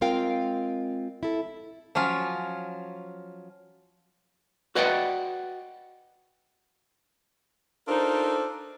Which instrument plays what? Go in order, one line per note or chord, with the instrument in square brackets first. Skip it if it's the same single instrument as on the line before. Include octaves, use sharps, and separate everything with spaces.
[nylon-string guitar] G#3 C4 F4 A#4 F5 G5
E4 A4
[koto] F3 F#3 C#4 F4
[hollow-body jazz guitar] F#4 B4 D5 D#5 F#5 G5
[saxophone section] D4 D#4 F4 A4 A#4 C5